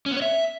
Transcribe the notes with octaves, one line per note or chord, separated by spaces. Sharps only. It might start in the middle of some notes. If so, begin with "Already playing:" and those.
C#4
B3
C#5
E5